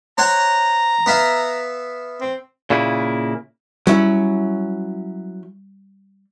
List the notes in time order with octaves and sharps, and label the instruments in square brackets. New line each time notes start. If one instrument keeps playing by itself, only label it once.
[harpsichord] C5 C#5 F#5 [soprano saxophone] A#5
[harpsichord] B3 E5 F5
[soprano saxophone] C4
[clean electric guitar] A#2 C#3 A#3 E4
[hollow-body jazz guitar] F#3 C#4 E4 [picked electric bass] G3